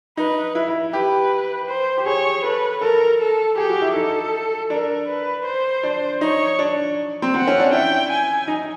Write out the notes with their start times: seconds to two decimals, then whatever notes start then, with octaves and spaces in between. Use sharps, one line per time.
0.17 D#4 B4
0.55 E4
0.68 E4
0.93 G4 B4
1.68 C5
1.98 G4
2.06 G#4 C#5
2.44 A4 B4
2.81 A4 A#4
3.20 A4
3.57 G4 G#4
3.69 F#4
3.82 E4
3.94 D#4 A4
4.70 D4 A#4
5.08 B4
5.45 C5
5.83 D4
6.21 D#4 C#5
6.59 D4
7.22 C4
7.34 C4 F#5
7.47 C#4
7.60 D4
7.72 E4 G5
8.10 G#5
8.48 D#4